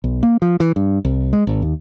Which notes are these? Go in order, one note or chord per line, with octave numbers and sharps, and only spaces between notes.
B1
A#3
F3
E3
G2
C2
G#3
G#1
D#2